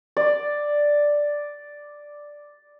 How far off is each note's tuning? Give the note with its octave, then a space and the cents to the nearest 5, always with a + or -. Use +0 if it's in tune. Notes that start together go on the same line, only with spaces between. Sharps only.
D5 +0